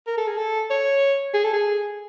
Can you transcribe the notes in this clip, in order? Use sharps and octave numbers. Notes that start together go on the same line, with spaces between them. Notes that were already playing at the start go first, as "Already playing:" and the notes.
A#4
A4
G#4
A4
C#5
G#4
A4
G#4